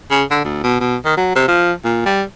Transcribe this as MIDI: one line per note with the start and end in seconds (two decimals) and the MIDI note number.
0.11 0.23 49
0.31 0.41 50
0.44 0.59 38
0.64 0.79 47
0.80 0.96 47
1.05 1.16 51
1.17 1.33 54
1.36 1.47 48
1.48 1.72 53
1.84 2.02 46
2.05 2.23 55